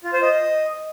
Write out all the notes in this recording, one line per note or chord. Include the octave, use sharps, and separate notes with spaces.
F4
C5
D#5